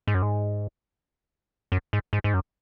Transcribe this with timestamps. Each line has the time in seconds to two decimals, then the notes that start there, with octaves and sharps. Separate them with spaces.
0.07 G#2
0.14 F#2
0.22 G#2
1.72 F#2
1.93 G#2
2.13 G#2
2.24 G#2
2.34 F#2